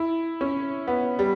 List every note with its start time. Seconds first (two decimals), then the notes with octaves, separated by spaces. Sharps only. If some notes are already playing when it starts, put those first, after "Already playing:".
Already playing: E4
0.41 C#4
0.87 B3
1.19 G3